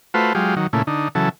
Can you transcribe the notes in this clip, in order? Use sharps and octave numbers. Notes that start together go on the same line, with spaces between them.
A3 F4 F#4 B4 C5
F#3 G#3 F4 G4
D#3 F#3
A#2 C#3 A3 E4
D3 D#4
C#3 E3 F#3 A4